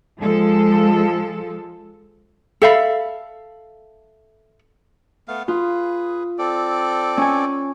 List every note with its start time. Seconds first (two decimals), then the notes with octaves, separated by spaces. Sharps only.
0.19 F3 G#3 A4
2.62 A4 E5 F5 B5
5.28 A3 B3 F5
5.48 F4 G#4 B4
6.38 C4 A4 D5
7.17 C#4 G#5